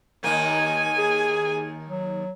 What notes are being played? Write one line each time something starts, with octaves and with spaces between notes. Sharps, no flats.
D#2 D#3 A#3 G#5
G#4
F#3